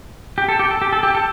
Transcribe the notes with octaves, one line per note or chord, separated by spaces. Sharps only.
G4
A4
G4
A4
G4
A4
G4
A4